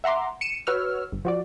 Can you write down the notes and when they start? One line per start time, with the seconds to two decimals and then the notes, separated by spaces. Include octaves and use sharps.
0.04 E5 F#5 A#5 C6 D6
0.41 C#7 D#7 E7
0.67 F#4 B4 C#5 E6 F6
1.12 G1
1.25 F3 F#4 D5